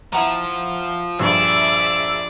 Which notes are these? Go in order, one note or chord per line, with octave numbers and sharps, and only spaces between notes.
F3 E4 F#5 A#5
A#1 G2 G#4 D5 E5